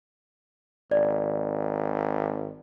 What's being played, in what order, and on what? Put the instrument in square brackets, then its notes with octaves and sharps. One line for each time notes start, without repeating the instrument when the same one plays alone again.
[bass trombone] G#1 [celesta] D5